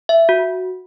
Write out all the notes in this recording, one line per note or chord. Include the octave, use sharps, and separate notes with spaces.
E5
F#4